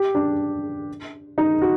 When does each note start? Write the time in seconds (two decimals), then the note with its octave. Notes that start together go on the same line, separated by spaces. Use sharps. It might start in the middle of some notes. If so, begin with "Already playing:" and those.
Already playing: G4
0.15 D4
1.38 D#4
1.62 F#4